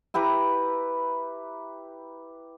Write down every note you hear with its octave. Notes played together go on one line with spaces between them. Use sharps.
E4 G4 B4 A#5